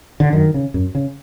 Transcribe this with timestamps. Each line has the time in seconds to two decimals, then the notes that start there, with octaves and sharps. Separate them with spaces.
0.20 D3
0.33 F#2 D#3
0.54 C#3
0.74 F#2
0.95 C#3